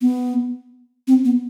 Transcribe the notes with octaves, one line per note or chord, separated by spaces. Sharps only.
B3
C4
B3